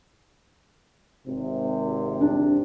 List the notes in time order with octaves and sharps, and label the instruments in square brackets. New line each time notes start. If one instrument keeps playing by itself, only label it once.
[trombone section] G#1 C3
[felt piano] D4